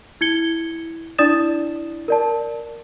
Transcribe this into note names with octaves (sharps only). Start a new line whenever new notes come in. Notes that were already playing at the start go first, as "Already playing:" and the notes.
E4 G#6 C#7 G7
D4 E4 D5 D#6 A6 E7
A#4 D5 A5